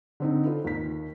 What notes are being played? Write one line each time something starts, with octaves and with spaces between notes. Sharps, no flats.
D3 C4 D#4
F4 A4 B4
D#2 B6